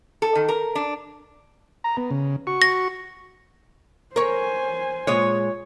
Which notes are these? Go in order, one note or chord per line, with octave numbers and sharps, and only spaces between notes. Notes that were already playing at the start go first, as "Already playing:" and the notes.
A4
D#3
A#4
D4
A#5
B3
C#3
F#4 C#6
A#6
A#4 C5 C#5 G#5
A#2 G#3 C#5 D#5